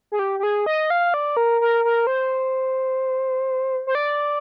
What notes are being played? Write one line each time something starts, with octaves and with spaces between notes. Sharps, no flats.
G#4
G4
G4
G#4
D#5
F5
D5
A#4
A#4
A#4
C5
C5
D5